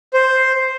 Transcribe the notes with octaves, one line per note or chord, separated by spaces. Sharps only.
C5